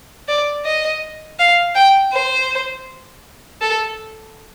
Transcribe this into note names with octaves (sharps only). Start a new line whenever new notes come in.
D5
D#5
F5
G5
C5
A4